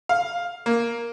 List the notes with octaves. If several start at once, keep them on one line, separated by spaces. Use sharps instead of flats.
F5
A#3